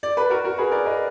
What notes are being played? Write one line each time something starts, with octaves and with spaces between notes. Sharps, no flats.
D5
B4
F#4 A#4
F#4 A#4
G#4 B4
A#4 D5
B4 D#5